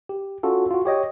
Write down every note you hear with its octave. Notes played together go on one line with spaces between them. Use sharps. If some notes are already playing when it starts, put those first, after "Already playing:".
G4
C#4 F4 F#4 A4
F4 F#4
G4 C#5 D#5 G5